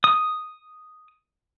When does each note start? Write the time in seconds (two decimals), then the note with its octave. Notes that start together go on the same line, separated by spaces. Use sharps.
0.04 D#6